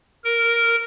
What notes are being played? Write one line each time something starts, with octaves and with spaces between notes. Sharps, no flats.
A#4